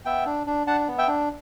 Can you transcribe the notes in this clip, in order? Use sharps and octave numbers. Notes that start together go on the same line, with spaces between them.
B3 E5 G5
D4
D4
D4 F#5 A5
B3
E5 G5
D4